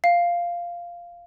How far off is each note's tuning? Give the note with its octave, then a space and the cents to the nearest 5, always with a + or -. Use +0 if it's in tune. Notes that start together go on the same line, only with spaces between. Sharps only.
F5 -5